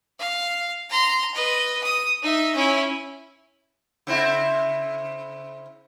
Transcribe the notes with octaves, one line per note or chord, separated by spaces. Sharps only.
F5
A#5 C6
B4 D#5
D#6
D#4 E5
C#4 E4
C#3 C4 E4